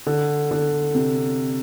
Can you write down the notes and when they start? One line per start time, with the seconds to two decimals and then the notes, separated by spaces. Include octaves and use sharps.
0.07 D3
0.51 D3
0.95 C3